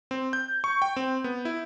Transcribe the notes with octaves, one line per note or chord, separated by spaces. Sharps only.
C4
G6
C#6
G5
C4
B3
E4